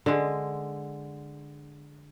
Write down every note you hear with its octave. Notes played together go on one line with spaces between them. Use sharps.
D3 G#3